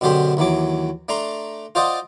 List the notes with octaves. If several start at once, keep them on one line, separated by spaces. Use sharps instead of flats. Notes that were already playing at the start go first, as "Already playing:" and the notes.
F#2 B2 D3 G4 C5 B5
D#2 E3 F#3 D6
A3 D4 A#5 C6
F4 C5 D5 D#5 F#5